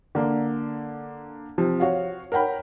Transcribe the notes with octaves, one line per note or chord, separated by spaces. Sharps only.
D3 A#3
C3 F3
F#4 C#5 F5
A#4 C#5 F#5 G5 B5